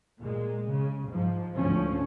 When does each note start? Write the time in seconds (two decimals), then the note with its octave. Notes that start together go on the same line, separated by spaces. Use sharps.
0.19 A#2 G#3
0.70 C#3
1.08 G#2 F3
1.56 D2 G#2 F3 C#4